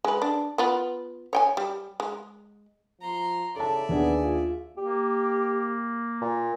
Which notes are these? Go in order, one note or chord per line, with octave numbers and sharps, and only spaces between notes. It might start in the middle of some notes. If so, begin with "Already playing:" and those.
G#3 B4
D4
B3 F4 B4
C#5 G5 G#5
G3
G#3
F3 A#5 C6
C#3 A4 D5 E5 A5
D#2 B3 D4 G#4
F4
A#3 G4
A#2